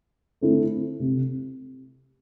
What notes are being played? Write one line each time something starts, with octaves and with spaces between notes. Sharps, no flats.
D3 A3 C4 E4 A4
C3